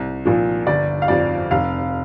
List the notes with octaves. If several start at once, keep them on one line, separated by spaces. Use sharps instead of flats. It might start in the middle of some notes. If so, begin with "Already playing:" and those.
Already playing: C2
A#2 F3
G1 D5
F5
F2 F3 D5
F1 F5